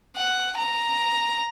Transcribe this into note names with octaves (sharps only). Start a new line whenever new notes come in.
F#5
A#5